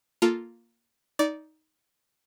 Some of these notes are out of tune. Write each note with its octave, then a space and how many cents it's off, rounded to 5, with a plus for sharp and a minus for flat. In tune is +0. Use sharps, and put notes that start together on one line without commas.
A#3 +0 F4 +0 A4 +0
D#4 +10 D5 -15